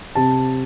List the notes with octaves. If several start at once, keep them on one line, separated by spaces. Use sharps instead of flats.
C3 A5